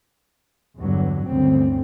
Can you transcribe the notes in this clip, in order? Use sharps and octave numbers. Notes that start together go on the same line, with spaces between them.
E2 G2 D3 F#3
G1 D2 C#3 C4